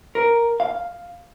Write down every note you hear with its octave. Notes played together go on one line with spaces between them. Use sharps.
A#4
F5